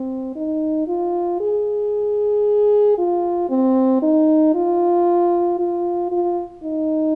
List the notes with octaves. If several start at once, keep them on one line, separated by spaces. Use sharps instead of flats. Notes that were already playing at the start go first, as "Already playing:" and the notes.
Already playing: C4
D#4
F4
G#4
F4
C4
D#4
F4
F4
F4
D#4